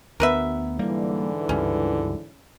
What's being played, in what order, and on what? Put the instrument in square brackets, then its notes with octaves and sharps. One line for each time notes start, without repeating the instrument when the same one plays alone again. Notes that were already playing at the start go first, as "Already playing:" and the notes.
[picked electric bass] D2 B3 [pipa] A#4 B4 E5
[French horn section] G#2 D3 E3 [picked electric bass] G3 A#3
[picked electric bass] C#2 G2 [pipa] C#4